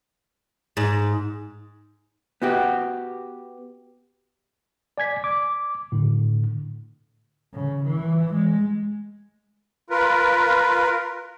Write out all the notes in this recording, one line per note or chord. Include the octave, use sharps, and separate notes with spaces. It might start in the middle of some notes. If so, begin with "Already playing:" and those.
G#2
B3 F#4 G4
D5 G#5 G#6 B6
D6
A2 D3
C#3
E3
G#3
F4 A#4 B4